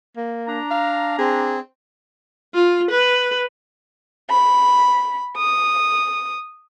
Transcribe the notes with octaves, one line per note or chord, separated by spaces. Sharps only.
A#3
D4 A#5
F5
C4 G#4
F4
B4
B5
D#6